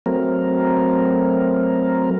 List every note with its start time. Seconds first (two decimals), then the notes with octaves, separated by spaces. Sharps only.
0.06 F#3 A3 C4 A#4